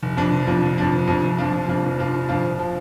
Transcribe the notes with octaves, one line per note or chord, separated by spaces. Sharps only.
F1
F2 F3 D4
F1
F2 F3 D4
F1
F2 F3 D4
F1
F2 F3 D4
F1
F2 F3 D4 F4
F1
F2 F3 D4 F4
F1
F2 F3 D4 F4
F1
F2 F3 D4 F4
F1
F3